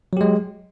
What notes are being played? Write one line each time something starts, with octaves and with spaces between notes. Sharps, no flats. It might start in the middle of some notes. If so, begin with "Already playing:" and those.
F#3 G#3 G4